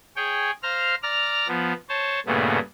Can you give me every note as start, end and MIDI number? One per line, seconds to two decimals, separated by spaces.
0.16 0.51 68
0.16 0.51 73
0.16 0.51 79
0.63 0.95 72
0.63 0.95 77
0.63 0.95 82
0.63 0.95 89
1.03 1.47 74
1.03 1.47 82
1.03 1.47 89
1.48 1.73 53
1.48 1.73 59
1.89 2.20 72
1.89 2.20 73
1.89 2.20 81
2.26 2.59 43
2.26 2.59 46
2.26 2.59 49
2.26 2.59 57
2.26 2.59 59